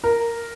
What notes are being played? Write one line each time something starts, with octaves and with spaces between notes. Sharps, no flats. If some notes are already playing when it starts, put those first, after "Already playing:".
A#4